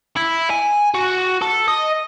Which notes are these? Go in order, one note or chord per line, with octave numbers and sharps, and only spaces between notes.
E4
G#5
F#4
A4
D#5